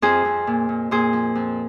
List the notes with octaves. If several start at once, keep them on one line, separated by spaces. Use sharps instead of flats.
F2 G#4 C5
F2
A#2
A#2
A#2 G#4 C5
F3
F2